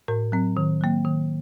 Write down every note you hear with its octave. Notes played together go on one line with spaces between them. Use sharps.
A2 A#4
F#3 C4
D#3
F#3 A#3
D#3